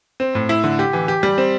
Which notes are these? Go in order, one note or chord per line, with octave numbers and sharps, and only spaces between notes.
C4
A2
E4
D3
G4
E3
G4
G3
C4